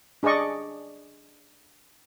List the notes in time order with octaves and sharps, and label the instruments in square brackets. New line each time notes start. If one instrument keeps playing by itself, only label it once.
[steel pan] D4 G#4 D5 D#5 C#6